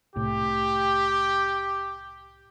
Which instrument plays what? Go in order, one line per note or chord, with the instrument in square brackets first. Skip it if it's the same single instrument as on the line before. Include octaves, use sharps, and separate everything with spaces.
[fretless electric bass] C2 A2 [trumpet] G4